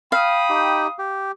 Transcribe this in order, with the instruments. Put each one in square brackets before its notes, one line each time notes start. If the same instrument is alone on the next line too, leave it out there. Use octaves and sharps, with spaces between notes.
[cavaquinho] F5 [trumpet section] G5 B5 D#6
[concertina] D#4 G4
G4